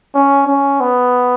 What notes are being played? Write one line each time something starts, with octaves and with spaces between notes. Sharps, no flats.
C#4
C#4
B3